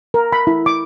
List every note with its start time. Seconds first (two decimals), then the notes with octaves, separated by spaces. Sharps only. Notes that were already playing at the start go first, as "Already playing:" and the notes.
0.14 A#4
0.33 B5
0.47 E4
0.66 D6